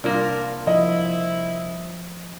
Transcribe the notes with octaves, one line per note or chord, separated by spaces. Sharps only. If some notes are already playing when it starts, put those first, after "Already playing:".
C2 A#3 D4 F4 A#4 D5
F3 E4 D#5